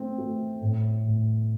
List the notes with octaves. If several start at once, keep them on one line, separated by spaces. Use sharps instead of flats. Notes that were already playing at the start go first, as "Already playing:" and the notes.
Already playing: A3 C4
A3
A2
A2